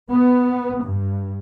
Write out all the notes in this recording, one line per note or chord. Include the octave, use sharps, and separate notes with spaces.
B3
G2